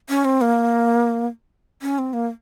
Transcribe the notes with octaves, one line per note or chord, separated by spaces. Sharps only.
C#4
C4
A#3
C#4
C4
A#3